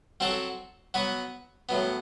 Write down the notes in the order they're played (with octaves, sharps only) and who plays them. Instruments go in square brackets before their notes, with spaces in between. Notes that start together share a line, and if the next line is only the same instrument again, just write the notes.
[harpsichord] F#3 C4 F#4 A4
F#3 B3 F#4 B4
A2 F#3 B3